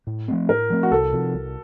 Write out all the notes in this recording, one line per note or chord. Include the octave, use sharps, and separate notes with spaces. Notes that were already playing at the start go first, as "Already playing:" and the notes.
A2
F3 A3 C4
A2 A#4
F3 A3 C4
F#4
C2 A4
C3 F3
C2